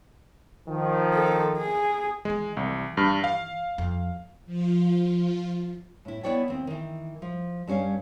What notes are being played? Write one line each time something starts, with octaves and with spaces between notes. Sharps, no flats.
D#3 F3
A4
G#4
D#3 E3 G#3
C2
G2 F6
F5
F2
F3 F4
A2 E4
B3 E4 B4 C#5 D5 G5
D#2 C4
D#3 E3
F3
G2 G3 C#4 C#5 F5